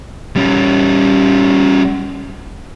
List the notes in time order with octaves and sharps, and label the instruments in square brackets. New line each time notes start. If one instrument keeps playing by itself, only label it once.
[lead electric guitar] G3 C#4